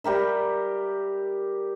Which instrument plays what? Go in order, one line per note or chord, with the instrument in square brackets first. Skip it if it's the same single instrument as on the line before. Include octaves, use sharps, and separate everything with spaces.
[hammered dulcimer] G3 G4 A#4 E5